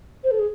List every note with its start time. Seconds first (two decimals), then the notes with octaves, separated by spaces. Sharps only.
0.24 C5
0.31 A4
0.39 G#4